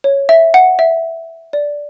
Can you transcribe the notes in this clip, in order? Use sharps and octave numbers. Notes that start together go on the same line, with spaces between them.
C#5
E5
F#5
E5
D5